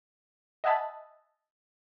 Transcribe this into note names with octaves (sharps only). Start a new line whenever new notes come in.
D#5 E5 F#5 G#5 A5 B5